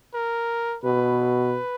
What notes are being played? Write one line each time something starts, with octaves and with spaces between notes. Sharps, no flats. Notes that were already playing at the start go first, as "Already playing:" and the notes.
A#4
B2 B4